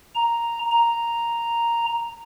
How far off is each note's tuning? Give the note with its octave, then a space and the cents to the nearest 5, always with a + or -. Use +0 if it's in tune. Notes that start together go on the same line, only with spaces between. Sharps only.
A#5 +0
A#5 +0